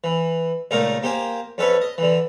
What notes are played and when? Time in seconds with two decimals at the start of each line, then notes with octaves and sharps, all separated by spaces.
0.04 E3
0.71 C#2 A#2 A3 D#4 A#4 F5
1.03 A#3 G4 C5 G#5
1.58 F2 C#4 A4 B4 C#5 C#6
1.81 D#5
1.98 D3 E3